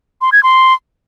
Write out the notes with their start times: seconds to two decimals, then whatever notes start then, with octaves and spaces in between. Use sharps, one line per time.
0.22 C6
0.32 G#6
0.43 C6